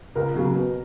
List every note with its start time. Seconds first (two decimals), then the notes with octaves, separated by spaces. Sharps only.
0.15 C#2 A#4
0.34 C#3 F#3 A#3
0.54 B2